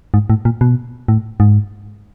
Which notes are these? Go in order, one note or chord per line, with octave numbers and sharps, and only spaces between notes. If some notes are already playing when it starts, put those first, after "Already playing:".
G#2
A2
A#2
B2
A2
G#2